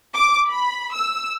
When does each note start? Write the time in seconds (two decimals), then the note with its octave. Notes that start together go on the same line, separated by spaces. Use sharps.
0.14 D6
0.50 B5
0.93 E6